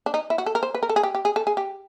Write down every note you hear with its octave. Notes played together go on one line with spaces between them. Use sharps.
D4
D#4
E4
F#4
A4
A#4
C5
B4
A#4
A4
G#4
G4
G4
G#4
A4
G#4
G4